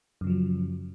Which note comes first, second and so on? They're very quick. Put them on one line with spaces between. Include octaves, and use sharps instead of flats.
F#2 C#3 F3 F#3